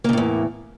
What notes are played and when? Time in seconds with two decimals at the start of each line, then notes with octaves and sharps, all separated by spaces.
0.04 A#3
0.09 C#3
0.13 A2
0.17 E2